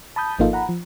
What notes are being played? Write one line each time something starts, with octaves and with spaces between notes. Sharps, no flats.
A5 B5 D#6 G6
G#1 F3 A#3 D#4 F4 A4
F#5 A#5 B5
F3